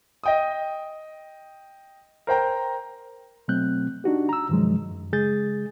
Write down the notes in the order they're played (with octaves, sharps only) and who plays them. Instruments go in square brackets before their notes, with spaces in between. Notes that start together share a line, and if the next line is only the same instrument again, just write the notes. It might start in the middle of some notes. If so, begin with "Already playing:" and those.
[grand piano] D#5 G5 D#6
A#4 C5 G5 A#5
[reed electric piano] B2 F#3 A3 C4 F#6 G6
D4 D#4 F#4 G4
A#5 E6
G2 C3 D#3 F3 F#3 G#3
F#2
C#3 G#3 G#4 G6 A6